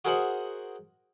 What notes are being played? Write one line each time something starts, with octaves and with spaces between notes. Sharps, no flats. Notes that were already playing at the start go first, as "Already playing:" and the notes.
F#4 G#4 A#4 C5 D#5 F#5